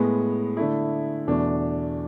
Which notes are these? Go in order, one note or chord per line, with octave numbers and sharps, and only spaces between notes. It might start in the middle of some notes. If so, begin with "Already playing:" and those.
Already playing: A2 G#3 B3
D3 A3 E4
E2 B2 A3 D4